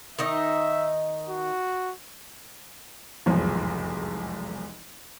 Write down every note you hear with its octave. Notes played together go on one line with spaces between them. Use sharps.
D#3 D#4 D#5 E5
F#4
F1 B1 E2 G#2 F3